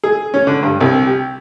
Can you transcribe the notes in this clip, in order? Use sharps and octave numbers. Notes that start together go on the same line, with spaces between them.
G#4
C#4
D3
G2
C2
G4